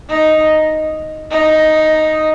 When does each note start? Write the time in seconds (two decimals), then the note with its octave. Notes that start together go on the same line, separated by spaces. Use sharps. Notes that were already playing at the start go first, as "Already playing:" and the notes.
0.10 D#4
1.31 D#4